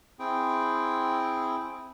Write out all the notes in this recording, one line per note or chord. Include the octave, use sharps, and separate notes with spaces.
C4 E4 G#4 G5